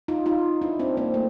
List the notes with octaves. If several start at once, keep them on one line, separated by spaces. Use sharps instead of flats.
D#4 F4
D#4 F4
D4 E4
C4 D4
A#3 C4
A3